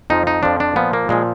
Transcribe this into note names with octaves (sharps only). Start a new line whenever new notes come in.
F2 F3 D#4
D#4
F2 F3 D4
D4
A#2 F3 B3
A#3
A#2 F3 G#3